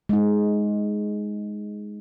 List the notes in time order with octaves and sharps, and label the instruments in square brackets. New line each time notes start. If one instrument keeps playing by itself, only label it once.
[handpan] G#3 D#4